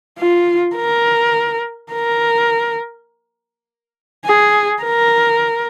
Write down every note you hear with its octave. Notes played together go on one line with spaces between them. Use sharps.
F4
A#4
A#4
G#4
A#4